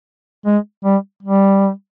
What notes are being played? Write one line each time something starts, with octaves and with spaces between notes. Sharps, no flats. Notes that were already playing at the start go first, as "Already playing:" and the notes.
G#3
G3
G3